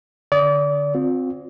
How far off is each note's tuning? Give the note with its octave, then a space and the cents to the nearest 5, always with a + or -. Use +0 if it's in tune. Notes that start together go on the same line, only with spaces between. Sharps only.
D3 +0 D5 -30 D#6 +0
C4 +0 F4 +40